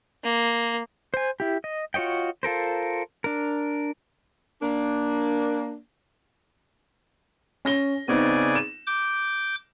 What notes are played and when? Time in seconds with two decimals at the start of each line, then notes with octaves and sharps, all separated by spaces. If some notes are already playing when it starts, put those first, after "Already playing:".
0.24 A#3
1.14 C5 G#5
1.40 E4 G4
1.64 D#5
1.94 F4 F#4 C#5 D#5 G5
2.43 F4 A4 A#4 C5
3.24 D4 A#4
4.63 A#3 D4
7.65 C#4 A#6 G7
8.08 C#3 B3 C4 D#4 D5 G#5
8.55 E7
8.87 D6 G6